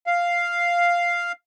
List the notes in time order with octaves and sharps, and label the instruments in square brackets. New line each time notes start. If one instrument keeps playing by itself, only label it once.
[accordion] F5